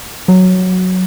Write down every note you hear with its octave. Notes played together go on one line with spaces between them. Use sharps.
F#3